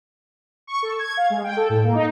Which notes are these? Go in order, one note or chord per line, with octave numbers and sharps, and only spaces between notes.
C#6
A4
G#6
F5
G#3
G5
A4
A2
A#3
D#4